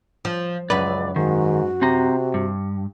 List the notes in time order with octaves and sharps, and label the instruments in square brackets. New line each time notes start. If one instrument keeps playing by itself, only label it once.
[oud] F3
[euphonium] C#2 [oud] F#2 B4 [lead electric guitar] D5
[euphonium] G#2 [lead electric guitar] D#3 [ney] F#4
[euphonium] C3 [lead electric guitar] C4 A#5
[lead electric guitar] G2